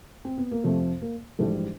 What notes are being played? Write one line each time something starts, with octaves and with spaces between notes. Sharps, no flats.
C4
B3
A#3
F2 C3 F3 A3
A#3
A#1 G#2 E3 G3 A3